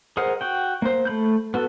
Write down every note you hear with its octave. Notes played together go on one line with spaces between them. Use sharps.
G#4 A#4 C5 D#5 F#5
F#4 G5
A#3 C5
A3 B5 G6
B3 F#4 A4